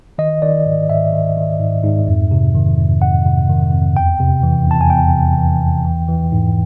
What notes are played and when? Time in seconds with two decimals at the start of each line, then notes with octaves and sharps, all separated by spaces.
0.18 D#3 D#5
0.42 D#3 D5
0.66 G#2
0.89 G#2 E5
1.13 D#3
1.37 D#3
1.60 G#2
1.83 G#2
2.08 F2
2.31 C3
2.55 D#3
2.78 F2
3.02 F2 F#5
3.26 C3
3.49 D#3
3.73 F2
3.96 E2 G5
4.20 C3
4.43 E3
4.66 E2 A5
4.81 G#5
4.90 E2 G5
5.14 C3
5.38 E3
5.61 E2
5.84 E3
6.08 E3
6.32 G#2